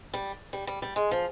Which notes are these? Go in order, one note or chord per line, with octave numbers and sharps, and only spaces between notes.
G3
G3
G3
G3
G#3
F3